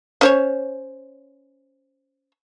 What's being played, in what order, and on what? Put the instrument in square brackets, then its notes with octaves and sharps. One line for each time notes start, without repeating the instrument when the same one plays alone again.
[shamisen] C#4 C5 C#5